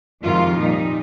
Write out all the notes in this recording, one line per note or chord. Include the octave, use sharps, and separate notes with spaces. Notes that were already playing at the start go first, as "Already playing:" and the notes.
F2 C3 D#3 G#3 F4
A#2 G3 D#4